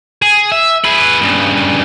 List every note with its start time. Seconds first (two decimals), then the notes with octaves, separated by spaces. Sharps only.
0.22 G#4
0.51 E5
0.84 G#4 B4
1.21 G2 C#3